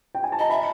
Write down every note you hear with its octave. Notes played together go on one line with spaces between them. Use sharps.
G5
G#5
A5
D#5 A#5
E5 B5